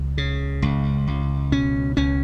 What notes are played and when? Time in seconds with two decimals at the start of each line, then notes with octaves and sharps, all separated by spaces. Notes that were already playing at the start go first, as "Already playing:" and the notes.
Already playing: C#2
0.18 C#3
0.62 C#2
1.07 C#2
1.52 B2 C#4
1.97 C#2 C#4